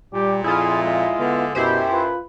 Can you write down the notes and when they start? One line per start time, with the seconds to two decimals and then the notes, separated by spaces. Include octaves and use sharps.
0.14 A#2 G3 G4
0.44 F2 E4 F4 G#4
0.82 G#3
1.19 D3 B3
1.55 F#2 B2 E4 G4 C5
1.91 F4 B4